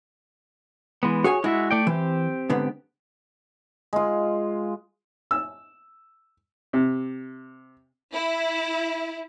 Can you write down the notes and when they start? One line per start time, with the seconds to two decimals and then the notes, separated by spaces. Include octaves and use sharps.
1.03 E3 G#3 B3
1.24 F#4 G#4 C#5 G#5
1.44 G#3 E4 F#4 E5
1.71 A3 D5 G5
1.87 E3 C4 G4
2.50 G#2 D3 B3
3.93 G#3 F4
5.31 E6
6.73 C3
8.13 E4